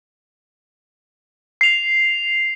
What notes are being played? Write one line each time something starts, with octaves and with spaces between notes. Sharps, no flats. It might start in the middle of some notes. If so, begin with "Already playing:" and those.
C7 F7